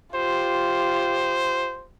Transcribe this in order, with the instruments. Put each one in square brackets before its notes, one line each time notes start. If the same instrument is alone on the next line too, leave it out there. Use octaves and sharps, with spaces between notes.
[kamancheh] F4 G4 [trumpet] C5